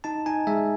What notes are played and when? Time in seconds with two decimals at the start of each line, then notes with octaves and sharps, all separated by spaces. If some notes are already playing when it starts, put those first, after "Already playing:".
0.04 D#4 A5
0.26 D#4 G#5
0.47 G#3 E5